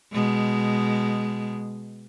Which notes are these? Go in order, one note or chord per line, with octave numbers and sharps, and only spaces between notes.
B2 G#3